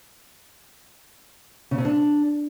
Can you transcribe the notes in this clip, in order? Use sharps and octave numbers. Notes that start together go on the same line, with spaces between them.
C#3
C3
D4